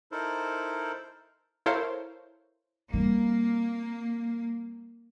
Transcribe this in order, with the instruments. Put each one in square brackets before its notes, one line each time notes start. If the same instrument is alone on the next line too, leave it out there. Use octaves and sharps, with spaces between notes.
[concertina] D#4 E4 A4 A#4 C5
[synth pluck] E4 A4 A#4 C5 C#5 F5
[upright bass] G3 C4 [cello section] A#3